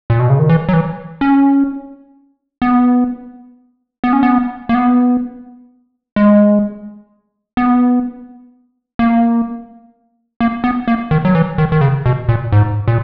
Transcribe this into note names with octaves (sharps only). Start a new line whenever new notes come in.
A#2
B2
C#3
D#3
E3
F#3
E3
C#4
B3
B3
C#4
B3
A#3
B3
G#3
B3
A#3
A#3
B3
A#3
D#3
F#3
E3
D#3
D#3
C#3
B2
A#2
G#2
A#2